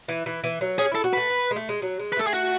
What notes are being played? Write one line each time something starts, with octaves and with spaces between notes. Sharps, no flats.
E3
E3
E3
F#3
C#4 G#4
E4 A4
F#4
A3 B4
B3
G#3
A3
G#3
F#3
G#3
B4
A3 A4
G#4
F#4